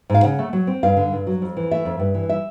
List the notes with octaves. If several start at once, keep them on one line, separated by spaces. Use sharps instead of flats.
G#2 F5
C#3 F#5
A3
F#3
C4
G2 F5
D3
G2
F#3
F2
E3
A3 E5
F2
G2
E3
E5